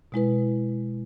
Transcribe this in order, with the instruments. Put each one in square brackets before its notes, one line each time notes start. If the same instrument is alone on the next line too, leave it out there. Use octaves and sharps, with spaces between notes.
[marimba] B2 G#3 E4 B4